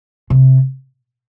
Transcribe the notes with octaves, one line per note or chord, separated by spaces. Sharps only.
C3